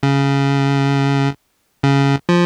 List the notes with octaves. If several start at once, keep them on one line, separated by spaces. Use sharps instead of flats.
C#3
C#3
F3